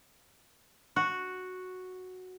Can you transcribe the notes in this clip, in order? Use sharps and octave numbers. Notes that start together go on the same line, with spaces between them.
F#4